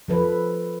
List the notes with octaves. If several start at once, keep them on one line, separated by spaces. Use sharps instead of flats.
F3 A4 B4